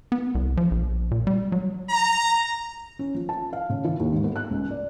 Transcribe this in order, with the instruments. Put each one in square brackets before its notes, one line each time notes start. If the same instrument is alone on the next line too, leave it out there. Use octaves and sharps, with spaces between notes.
[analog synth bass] B3
C2
F3
A#1
A#2
G3
F#3
[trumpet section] A#5
[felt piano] C#4
F3
A5
F5
C#3
E3
D#2
G#2
B3
F#6
C#2
D5